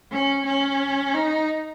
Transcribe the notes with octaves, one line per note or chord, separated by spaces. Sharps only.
C#4
C#4
D#4